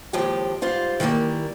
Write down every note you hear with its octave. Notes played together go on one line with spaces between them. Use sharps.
D#2 A2 F3 G#3 G4
G#2 G3 F4 C5
D#3 E3 G3 A3 A#3